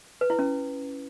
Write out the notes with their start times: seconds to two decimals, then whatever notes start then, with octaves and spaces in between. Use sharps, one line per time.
0.21 B4
0.30 E4
0.39 C#4